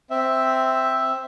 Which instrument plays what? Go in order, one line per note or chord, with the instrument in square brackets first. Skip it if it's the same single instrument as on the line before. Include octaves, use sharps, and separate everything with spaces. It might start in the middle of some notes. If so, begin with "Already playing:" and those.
[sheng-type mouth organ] C4 E5